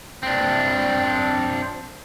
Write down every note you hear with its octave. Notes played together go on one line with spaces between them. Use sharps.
C4 D4